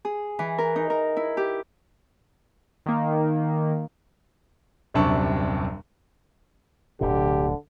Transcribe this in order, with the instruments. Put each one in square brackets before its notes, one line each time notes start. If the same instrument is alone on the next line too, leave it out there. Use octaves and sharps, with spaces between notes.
[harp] G#4
E3
A#4
D#4
A#4
E4
G4
[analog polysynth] D#3 A#3
[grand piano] D#1 F#2 C3 D4 A5 C#6
[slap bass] D1 D2 B2 [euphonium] D3 [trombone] G4